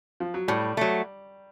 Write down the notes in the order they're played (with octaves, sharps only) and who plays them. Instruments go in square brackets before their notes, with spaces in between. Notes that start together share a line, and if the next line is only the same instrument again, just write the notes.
[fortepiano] F3
F#3
[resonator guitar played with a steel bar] A2 [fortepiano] G3
[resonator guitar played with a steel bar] F#3 A3